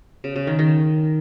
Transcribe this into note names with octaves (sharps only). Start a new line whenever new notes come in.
C#3
C#3
D#3
D#3